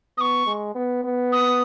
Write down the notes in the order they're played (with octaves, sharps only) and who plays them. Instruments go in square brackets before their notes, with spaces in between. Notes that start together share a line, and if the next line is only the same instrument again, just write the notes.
[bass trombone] B3 [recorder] C#6 D#6
[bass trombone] G#3
B3
B3
[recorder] D#6